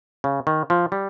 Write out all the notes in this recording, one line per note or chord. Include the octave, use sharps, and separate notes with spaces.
C#3
D#3
F3
G3